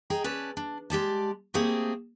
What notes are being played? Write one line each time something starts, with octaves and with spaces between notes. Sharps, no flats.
G#4 D#5 G5 A#5
C#4 B4 D5 A5
D4
G#3 G4 D5 A5
A3 A#3 C4 G4 G#4 C5